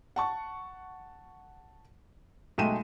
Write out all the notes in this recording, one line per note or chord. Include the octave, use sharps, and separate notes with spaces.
F#5 A5 C#6
B1 G#3 A3 G5 D#7 E7